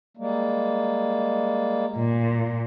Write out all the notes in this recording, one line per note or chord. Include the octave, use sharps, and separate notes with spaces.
G3 G#3 A#3
A#2